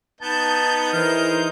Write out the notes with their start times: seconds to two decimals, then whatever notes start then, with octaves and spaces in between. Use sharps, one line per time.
0.21 B3 D#4 A5 G6
0.93 E3 G#4 A#4 C5 F6